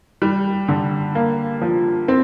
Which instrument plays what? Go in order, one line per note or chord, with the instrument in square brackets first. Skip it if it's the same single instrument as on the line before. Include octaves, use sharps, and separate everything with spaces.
[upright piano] G3
D3
A#3
F3
C4